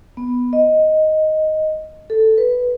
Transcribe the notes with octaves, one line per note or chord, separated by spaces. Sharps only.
B3
D#5
A4
B4